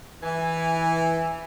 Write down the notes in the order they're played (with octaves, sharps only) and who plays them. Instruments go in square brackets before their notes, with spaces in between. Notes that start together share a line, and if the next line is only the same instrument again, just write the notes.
[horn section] E3 [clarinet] G#5